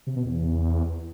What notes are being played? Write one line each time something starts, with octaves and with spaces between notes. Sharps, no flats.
C3
B2
E2